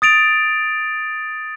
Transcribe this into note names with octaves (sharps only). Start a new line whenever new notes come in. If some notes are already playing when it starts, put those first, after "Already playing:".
D#6 A6 D7 F7